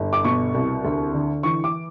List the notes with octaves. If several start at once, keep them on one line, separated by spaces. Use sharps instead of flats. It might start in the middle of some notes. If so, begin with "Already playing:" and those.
Already playing: G1
D6
B2 C#6
C2
D2
D3
E3 C#6
D6